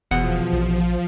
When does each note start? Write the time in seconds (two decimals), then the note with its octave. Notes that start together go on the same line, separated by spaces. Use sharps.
0.11 F1 E2 B2 F3 F#5
0.53 A#1